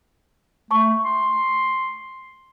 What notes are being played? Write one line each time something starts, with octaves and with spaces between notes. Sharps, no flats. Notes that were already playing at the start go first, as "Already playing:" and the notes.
A3 A5 C#6
C6